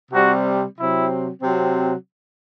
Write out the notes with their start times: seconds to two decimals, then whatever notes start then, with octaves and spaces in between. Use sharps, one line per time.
0.11 C3 G3 C4 F#4
0.77 C3 F#3 C4 E4
1.42 C3 F#3 C4